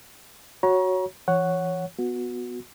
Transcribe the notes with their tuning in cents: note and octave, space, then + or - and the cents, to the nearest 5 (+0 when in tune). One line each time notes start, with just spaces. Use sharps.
F#4 +0 C#5 +0 A#5 +35
E3 +35 C#5 +0 F#5 +0
B3 +0 F#4 -20